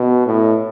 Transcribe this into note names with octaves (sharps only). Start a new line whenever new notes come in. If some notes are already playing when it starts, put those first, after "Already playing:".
Already playing: B2
A2